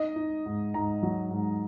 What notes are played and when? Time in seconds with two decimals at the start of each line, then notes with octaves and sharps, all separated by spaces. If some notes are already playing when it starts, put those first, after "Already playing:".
Already playing: D#4 D#5
0.16 D#4
0.46 G#2
0.74 G#2 A#5
1.03 F#3
1.30 G#2